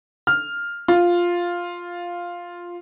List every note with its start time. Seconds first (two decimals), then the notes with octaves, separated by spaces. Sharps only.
0.27 F6
0.88 F4